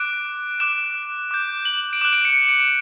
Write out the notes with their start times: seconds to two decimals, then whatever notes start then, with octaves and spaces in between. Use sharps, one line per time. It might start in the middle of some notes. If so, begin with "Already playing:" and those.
Already playing: D6 F#6 D7
0.60 D6 F#6 E7
1.31 D6 G6
1.65 F#7
1.93 D7
2.01 D6 F#6 E7
2.13 D7
2.25 C#7
2.48 D7
2.60 D7